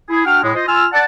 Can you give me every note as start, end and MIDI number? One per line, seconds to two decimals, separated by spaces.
0.09 0.22 64
0.09 0.22 68
0.25 0.40 62
0.25 0.40 66
0.25 0.40 78
0.25 0.40 79
0.25 0.40 89
0.43 0.51 45
0.43 0.51 56
0.55 0.64 65
0.55 0.64 72
0.55 0.64 75
0.67 0.85 65
0.67 0.85 80
0.67 0.85 88
0.67 0.85 89
0.93 1.04 74
0.93 1.04 78
0.93 1.04 81